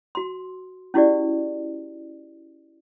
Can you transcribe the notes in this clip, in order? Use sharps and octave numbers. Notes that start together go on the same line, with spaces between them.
F#4 C6
C#4 E4 F#4 G4 D5